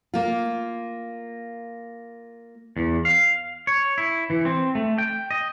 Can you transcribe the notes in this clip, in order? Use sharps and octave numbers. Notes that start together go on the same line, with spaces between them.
A#3 F4
E2
F5
C#5
E4
E3
C4
A3
G5
D#5